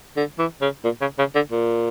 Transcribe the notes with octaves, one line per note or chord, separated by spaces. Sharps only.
D3
E3
C#3
A#2
C#3
C#3
D3
A#2